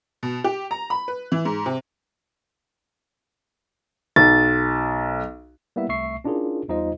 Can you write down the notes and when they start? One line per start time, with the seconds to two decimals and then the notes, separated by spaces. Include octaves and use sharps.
0.23 B2
0.44 G4
0.71 A#5
0.90 B5
1.08 B4
1.32 E3
1.45 G#2
1.66 C3
4.16 B1 A6
5.76 G3 A#3 B3 E4 E5
5.89 C2 A3 E5 C#6 C7
6.24 C#4 D4 E4 F4 G#4 A#4
6.68 E2 G3 D#4 F4 C5 D#5